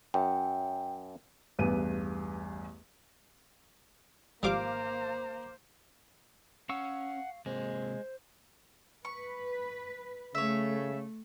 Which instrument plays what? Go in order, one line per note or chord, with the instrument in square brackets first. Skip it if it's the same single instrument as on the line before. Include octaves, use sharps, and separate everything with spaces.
[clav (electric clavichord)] F#2 [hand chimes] G5
[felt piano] A1 E2 G2 B4 D#7
[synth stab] G#1 F5 D6 [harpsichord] F3 G3 [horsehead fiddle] A#3 A#5 [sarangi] C5
[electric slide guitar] C#4 [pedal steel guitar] F5 C#6 E6 [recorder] F#5
[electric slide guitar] C3 A#3 [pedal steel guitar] G#3 [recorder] C5
[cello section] B4 [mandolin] C#6
[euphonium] C#3 [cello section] A3 [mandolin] C#5 E5